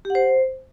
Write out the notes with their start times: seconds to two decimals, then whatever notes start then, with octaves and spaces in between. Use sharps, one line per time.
0.05 G4
0.10 F#5
0.15 C5